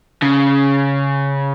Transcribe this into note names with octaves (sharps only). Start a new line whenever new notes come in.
C#3